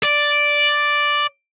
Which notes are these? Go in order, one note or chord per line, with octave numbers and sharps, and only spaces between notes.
D5